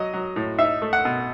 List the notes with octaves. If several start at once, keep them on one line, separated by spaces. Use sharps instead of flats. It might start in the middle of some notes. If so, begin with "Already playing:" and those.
Already playing: F#3 D#5
F#3
A2
D#4 E5
A3
F#5
B2